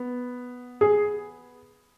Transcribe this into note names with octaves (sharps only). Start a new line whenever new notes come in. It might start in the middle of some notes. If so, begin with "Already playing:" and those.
Already playing: B3
G#4